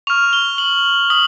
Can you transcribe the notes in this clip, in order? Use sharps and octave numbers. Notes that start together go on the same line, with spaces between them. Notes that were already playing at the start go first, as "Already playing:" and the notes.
C#6 F6 F7
G7
F#7
D#6 F#7